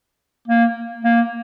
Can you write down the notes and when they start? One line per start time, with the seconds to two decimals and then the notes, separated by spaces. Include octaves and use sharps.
0.48 A#3
1.04 A#3